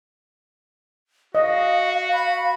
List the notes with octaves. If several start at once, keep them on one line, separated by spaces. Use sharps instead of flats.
F#4 D#5 F5
B5